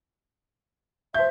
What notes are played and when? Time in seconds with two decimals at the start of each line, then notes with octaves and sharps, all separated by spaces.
1.14 C5 E5 G6